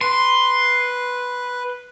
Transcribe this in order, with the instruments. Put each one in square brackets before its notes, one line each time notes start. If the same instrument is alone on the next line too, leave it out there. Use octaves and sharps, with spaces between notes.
[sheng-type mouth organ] B4 [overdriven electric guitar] C6